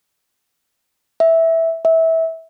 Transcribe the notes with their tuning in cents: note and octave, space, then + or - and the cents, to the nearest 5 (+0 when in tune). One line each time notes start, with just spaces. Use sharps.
E5 -5
E5 -20